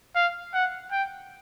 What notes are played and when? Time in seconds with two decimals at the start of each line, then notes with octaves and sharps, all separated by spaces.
0.15 F5
0.54 F#5
0.92 G5